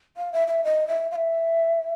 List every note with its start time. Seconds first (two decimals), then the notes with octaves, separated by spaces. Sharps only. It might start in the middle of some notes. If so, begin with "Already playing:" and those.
0.17 F5
0.33 E5
0.48 E5
0.64 D#5
0.88 E5
1.12 F5
1.16 E5